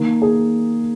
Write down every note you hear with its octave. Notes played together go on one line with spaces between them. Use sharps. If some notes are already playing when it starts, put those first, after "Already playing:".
Already playing: D#3 A#3
G#4